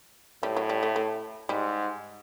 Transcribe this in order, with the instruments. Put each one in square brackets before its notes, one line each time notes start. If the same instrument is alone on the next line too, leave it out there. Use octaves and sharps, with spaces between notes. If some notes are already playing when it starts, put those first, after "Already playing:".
[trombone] A2 [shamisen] G3
[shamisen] F#3
G3
A3
A3
[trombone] G#2 [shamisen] G3